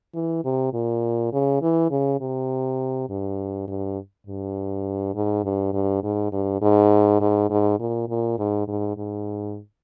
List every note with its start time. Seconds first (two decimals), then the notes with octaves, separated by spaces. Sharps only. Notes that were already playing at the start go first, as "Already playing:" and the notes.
0.14 E3
0.45 C3
0.73 A#2
1.33 C#3
1.62 E3
1.91 C#3
2.21 C3
3.10 G2
3.68 G2
4.27 G2
5.15 G#2
5.44 G2
5.73 G2
6.03 G#2
6.32 G2
6.62 G#2
7.21 G#2
7.50 G#2
7.80 A#2
8.09 A#2
8.38 G#2
8.68 G#2
8.97 G#2